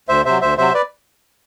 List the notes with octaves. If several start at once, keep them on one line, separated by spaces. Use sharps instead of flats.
D2 C5 E5
C3 F#3 C5 E5
D2 C5 E5
C3 F#3 C5 E5
B4 D5